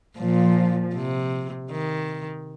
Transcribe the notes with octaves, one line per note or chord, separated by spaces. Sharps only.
A#2 F3
C3
D#3